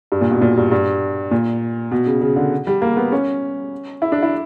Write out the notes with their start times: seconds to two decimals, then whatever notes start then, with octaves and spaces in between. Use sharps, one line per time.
0.12 G2
0.21 A#2
0.31 B2
0.42 A#2
0.57 G2
0.72 G2
1.31 A#2
1.91 B2
2.06 C#3
2.21 C#3
2.36 D3
2.67 G3
2.82 A#3
2.97 B3
3.12 C#4
4.02 E4
4.12 D4
4.22 E4